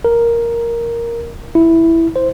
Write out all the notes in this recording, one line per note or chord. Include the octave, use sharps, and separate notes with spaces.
A#4
E4
C5